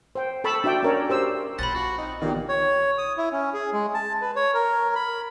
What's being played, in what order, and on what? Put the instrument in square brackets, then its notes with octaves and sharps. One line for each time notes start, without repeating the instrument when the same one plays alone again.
[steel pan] C5 G5
A4 A5 B5 C#6 E6
D4 F#4 D5 E5 G5
C#4 A#4 C#5 D5
G4 C5 E6
[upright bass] A#1 F4 [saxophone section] C#4 C5 F#5 [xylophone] B5 A6
[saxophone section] F3 F#4
C4 D#4
[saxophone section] A#2 [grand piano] D#3 B3 G4
[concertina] C#5
D#6
E4
C#4
G#4
G#3
A5
B4
C#5
A#4
B5